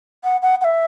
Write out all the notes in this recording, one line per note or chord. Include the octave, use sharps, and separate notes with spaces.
F#5
F#5
F#5
E5